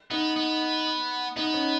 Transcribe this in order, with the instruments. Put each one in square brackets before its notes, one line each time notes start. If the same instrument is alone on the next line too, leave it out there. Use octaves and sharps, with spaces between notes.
[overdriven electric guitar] B3 [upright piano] D#4
[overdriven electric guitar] B3
[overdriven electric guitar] B3 [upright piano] D#4
[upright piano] C#4